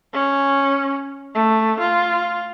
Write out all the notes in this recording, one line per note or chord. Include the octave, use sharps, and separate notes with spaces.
C#4
A3
F4